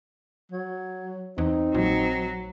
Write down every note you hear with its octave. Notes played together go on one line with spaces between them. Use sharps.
F#3
E2 C4 D#4
A#1 F#3